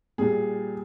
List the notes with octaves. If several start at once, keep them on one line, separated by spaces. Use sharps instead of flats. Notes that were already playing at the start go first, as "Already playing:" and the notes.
A#2 G3 G#4